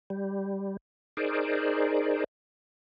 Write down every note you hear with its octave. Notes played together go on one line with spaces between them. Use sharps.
G3
D#4 G#4 A#4 C5 D5